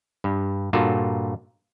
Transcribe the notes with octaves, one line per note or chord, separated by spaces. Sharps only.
G2
G2 A#2 F4 F#4 A4